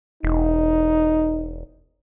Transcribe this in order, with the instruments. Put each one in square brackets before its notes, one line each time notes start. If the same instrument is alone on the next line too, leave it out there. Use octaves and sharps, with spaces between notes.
[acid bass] E1 [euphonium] D#4